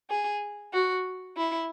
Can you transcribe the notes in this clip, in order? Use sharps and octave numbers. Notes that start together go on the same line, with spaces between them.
G#4
F#4
E4